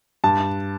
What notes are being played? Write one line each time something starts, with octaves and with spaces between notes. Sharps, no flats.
G2 A5